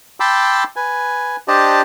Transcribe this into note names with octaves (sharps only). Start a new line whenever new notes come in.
G5 A5 B5 C6 D6 E6
B4 G#5
D4 G4 C5 D5 D#5 A5